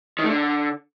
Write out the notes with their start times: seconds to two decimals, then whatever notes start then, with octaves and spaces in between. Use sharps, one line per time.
0.19 D#3
0.24 A3
0.29 D3